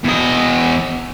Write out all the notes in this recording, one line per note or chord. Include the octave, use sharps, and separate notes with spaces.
E2 D#5